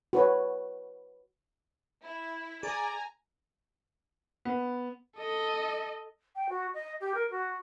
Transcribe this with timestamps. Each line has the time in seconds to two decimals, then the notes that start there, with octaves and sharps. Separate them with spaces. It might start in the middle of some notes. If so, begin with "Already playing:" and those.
0.13 F#4 B4 C#5
2.02 E4
2.63 G#4 D5 G#5 A#5
4.45 B3
5.17 A4 D#5
6.35 G5
6.49 F#4
6.74 D#5
7.01 G4
7.15 A#4
7.31 F#4